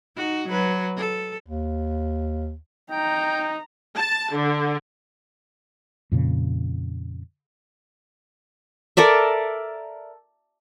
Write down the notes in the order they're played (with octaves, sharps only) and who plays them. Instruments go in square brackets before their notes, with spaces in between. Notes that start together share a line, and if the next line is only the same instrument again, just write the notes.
[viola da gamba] D#4 F#4
F#3 B4
A4
[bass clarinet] D#2
[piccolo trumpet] D#4 [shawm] G5 [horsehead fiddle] A#5
[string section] A5
D3
[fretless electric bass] F2 A#2 C#3
[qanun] A4 A#4 D5 E5